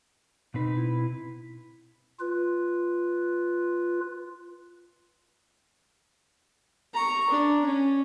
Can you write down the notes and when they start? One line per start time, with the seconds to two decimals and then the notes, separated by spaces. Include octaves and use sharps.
0.54 B2 C4 D#4 B4
0.75 E4
2.20 F4 B4
6.94 A#5 C#6
7.30 D4
7.65 C#4